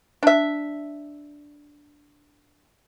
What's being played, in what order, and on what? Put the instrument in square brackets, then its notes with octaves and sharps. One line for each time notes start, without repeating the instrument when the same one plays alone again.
[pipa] D4 E5